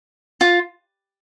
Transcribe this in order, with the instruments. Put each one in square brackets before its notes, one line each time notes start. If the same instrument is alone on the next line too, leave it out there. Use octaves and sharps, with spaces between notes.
[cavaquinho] F4